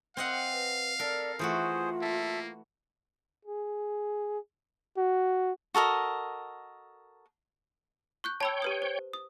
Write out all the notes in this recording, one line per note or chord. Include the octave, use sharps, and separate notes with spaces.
C4 D#5 F5 F#5
B4
A4 A#4 D5
E3 A3 F4 F#4 G#4 C5
A#3 A4 E5
G#4
F#4
F#4 A4 A#4 D#5
C#6 F#6 G6
C#5 G5 A5 B5 E6
G4 B4 D#6
C5
D#6